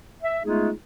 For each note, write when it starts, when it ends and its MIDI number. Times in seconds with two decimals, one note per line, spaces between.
0.23 0.38 76
0.44 0.70 56
0.44 0.70 57
0.44 0.70 59
0.44 0.70 63
0.44 0.70 65
0.44 0.70 68